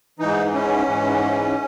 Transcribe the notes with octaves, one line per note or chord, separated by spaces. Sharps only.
G#2 E3 D#4
C#4
G#2 E3